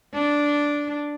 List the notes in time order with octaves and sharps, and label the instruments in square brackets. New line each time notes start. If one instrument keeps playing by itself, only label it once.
[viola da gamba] D4